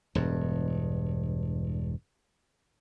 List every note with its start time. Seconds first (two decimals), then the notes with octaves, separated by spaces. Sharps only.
0.15 E1 G2